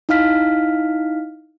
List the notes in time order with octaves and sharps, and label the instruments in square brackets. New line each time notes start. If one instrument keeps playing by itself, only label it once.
[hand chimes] D#4 E4 F5 F6 B6